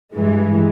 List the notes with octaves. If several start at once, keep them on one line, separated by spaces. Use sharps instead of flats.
G2 E3 G#3